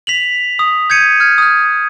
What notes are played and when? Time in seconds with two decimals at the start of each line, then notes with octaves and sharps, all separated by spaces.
0.07 B6 F7 F#7
0.59 D#6
0.90 G6 G#6 C#7 D#7
1.20 F6 G#6
1.38 D#6 F6